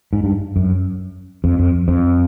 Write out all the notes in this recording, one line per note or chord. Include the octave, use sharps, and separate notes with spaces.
G#2
G2
F#2
F2
F2
F2